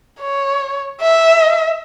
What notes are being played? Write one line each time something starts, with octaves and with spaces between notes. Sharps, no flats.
C#5
E5